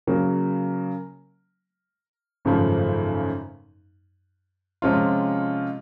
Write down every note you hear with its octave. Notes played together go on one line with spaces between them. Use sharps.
C#3 F#3 A#3
G#1 F#2 C#3 F3 A3
C3 F3 G#3 C#4 F4